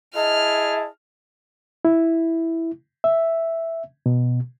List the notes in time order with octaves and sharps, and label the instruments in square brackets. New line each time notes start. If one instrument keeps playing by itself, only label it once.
[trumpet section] E4 G#4 A5 [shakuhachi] D#5 [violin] F6
[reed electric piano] E4
E5
B2